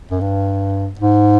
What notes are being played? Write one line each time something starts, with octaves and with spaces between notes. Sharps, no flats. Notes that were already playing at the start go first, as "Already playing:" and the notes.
F#2
G2
G#2